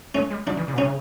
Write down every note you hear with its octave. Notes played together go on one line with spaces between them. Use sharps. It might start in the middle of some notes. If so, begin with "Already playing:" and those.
A3 C#4
G#3
F#3 D4
E3
C#3
B2
C#3 C#4